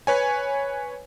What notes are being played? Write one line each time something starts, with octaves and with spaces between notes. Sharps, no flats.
B4 C#5 G#5